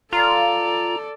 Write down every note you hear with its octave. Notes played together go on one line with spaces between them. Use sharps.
F4 A4 D5 A#5